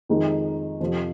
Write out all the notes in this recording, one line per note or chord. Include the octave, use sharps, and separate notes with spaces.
F2 D#3 G#3 D#4
F2 C3 F3